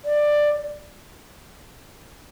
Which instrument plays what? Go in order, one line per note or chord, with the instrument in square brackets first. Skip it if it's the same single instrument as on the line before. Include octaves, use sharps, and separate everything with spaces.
[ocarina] D5